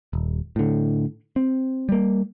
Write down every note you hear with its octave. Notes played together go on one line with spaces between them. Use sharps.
D#1
A2 D3
C4
G3 A#3